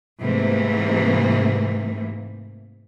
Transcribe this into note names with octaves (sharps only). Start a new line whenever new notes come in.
G#2 C3 E3 A3 A#3